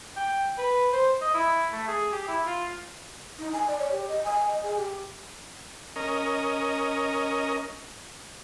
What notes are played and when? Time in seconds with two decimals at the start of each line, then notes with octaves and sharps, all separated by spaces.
0.16 G5
0.58 B4
0.93 C5
1.21 D#5
1.34 E4
1.72 A3
1.87 G#4
2.12 G4
2.28 E4
2.46 F4
3.39 D#4
3.53 G#5
3.67 D5
3.79 C#5
3.91 G4
4.08 D#5
4.24 G#5
4.48 D#5
4.63 G#4
4.76 G4
5.96 C#4 A#4 D#5